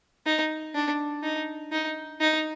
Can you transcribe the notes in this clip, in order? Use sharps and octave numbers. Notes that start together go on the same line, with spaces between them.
D#4
D4
D#4
D#4
D#4